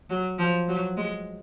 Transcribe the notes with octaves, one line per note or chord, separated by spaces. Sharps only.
F#3
F3
F#3
G#3